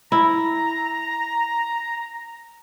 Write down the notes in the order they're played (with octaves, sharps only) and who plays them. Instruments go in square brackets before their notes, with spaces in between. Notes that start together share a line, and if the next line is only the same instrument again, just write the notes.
[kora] E4 [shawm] A#5